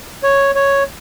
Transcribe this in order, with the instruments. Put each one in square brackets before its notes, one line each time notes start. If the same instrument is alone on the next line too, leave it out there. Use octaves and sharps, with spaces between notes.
[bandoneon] C#5
C#5